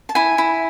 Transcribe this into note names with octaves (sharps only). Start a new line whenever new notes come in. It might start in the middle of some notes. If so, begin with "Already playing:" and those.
A5
E4 G#5
E4